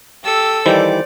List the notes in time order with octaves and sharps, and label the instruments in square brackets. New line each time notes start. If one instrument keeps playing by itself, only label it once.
[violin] G4 E6 [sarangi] A4
[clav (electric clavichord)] D#3 E3 G3 [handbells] C5 [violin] D5